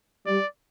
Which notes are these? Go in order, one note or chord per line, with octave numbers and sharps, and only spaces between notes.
G3 D5